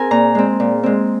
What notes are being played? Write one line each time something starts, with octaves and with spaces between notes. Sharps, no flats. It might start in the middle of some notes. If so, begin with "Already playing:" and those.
Already playing: C4 G#4 A#4 G#5
A#2 A#5
G#3 C4
A#2
G#3 C4